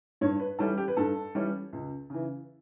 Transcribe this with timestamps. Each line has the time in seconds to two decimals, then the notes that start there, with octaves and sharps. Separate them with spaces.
0.21 G2 C#5
0.40 B4
0.59 E3 G3 C#4 A4
0.78 G4
0.88 B4
0.97 G2 A4
1.35 E3 G3 C#4
1.73 C#2
2.10 C#3 E3